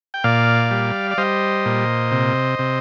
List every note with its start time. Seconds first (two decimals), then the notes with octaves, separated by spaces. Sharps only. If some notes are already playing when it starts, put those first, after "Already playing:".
0.14 G5
0.24 A#2 D5 F5
0.71 G3
1.11 D5
1.18 G3 C5 D#5
1.66 A#2
2.12 C3
2.59 C3